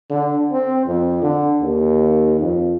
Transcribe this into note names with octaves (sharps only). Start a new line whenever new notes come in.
D3
C4
F2
D3
D#2
F2